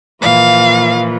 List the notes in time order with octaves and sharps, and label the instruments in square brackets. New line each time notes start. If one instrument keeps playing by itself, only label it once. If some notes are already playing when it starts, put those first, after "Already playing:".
[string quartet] A#2 E3 F3 [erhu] F5